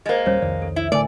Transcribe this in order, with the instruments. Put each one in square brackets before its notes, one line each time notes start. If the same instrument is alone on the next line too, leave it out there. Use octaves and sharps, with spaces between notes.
[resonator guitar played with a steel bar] G#3 A#3 [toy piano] C5 D#5
[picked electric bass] D#1 G3 C#4 [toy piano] C5 C#5
[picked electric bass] C2 F2 D#3 [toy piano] D5
[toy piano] A4
[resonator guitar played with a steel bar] E4
[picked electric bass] A1 D3 A3 [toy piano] A#4 G#5 [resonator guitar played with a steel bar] D5